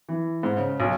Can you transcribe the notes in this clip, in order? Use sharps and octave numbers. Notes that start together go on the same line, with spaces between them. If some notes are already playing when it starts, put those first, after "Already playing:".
E3
G#2
C#3
B1